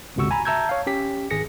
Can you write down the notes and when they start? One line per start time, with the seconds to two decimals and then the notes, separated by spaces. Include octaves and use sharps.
0.16 G1 C#2 C3 F#4 C#6 E6
0.31 G#5 A#5 B5
0.45 E5 A5 A#5 E6 G6 G#6
0.69 C#5 F5
0.87 C#4 G4 B6
1.30 G#1 G#4 A#6 C#7